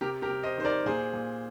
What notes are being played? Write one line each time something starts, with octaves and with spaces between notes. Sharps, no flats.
C3 G4 A#4
G4 A#4
C3
C5 D#5
D#3 C5
A#4 D5
A#2 G#4 C5
A#2